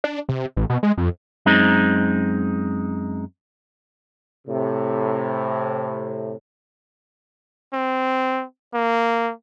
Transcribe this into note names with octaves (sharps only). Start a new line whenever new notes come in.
D4
C3
A1
B2
G#3
F2
F#2 G#3 C4 D#4
A2 C3
C4
A#3